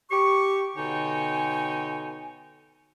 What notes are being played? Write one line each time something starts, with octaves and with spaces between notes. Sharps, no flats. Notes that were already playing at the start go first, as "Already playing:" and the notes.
G4 C#6
B2 D3 D#4 C#5 G5 G#5